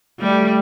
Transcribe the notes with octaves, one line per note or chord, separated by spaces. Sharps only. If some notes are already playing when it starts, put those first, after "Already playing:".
G3 A3